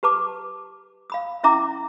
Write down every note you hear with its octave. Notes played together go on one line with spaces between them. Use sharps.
G4 B4 A5 D6
F5 B5 D#6
C#4 E4 E5 A#5 D6